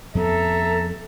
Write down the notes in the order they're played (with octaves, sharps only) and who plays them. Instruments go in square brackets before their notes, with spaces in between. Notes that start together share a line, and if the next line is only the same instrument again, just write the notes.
[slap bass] F2 B3 [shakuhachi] A4 [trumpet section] E5 A5 A#5